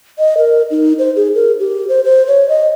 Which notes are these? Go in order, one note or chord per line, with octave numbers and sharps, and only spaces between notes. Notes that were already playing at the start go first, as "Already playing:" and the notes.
D#5
A#4
D#4
C5
G#4
A#4
G4
C5
C5
C#5
D#5